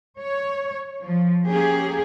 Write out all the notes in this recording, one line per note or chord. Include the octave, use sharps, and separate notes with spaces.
C#5
F3
A#3 C#4 G4 G#4